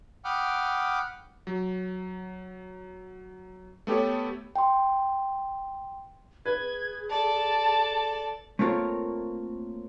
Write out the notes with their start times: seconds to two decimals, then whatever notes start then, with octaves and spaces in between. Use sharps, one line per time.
0.25 F#5 G5 B5 D6 D#6 F6
1.47 F#3
3.87 A3 B3 G4 A4 C#5
4.56 G5 C6
6.46 G#4 B4 G#6
7.09 A4 D5 A5
8.59 A3 A#3 C4 F4 A#4 C#5